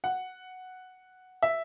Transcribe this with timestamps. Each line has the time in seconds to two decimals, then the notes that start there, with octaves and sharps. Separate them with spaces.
0.04 F#5
1.42 E5